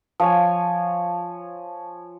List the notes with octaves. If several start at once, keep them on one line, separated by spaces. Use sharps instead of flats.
F3 C#5 G#5